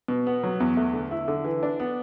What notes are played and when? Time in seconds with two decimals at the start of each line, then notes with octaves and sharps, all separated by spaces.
0.08 B2
0.27 B3
0.43 F#3
0.60 E2
0.77 A3
0.94 D3
1.11 E4
1.28 D3
1.45 E3
1.63 D4
1.80 B3